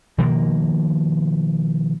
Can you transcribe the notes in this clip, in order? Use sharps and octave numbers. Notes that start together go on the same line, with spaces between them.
B2 D#3 F3 A#3